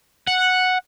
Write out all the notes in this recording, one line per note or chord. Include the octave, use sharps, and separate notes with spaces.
F#5